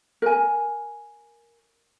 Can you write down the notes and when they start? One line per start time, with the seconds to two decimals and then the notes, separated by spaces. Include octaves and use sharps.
0.22 A#4 G#5